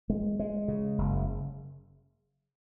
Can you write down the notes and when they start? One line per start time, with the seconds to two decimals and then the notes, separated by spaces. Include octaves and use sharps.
0.10 G#3
0.39 G#3
0.68 C#3
0.98 F#1